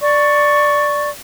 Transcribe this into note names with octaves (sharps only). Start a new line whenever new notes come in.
D5 C#6